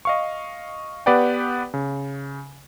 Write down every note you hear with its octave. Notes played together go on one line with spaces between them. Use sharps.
D#5 F5 C#6
B3 G4 B4 D5 F#5 G5
C#3